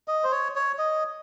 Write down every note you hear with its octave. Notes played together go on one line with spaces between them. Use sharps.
D#5
C5
C#5
C#5
D#5